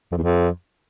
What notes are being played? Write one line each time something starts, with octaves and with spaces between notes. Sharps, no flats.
F2
E2
F2